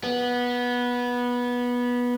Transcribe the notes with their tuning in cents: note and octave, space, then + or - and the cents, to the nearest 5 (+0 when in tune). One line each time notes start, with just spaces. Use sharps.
B3 -15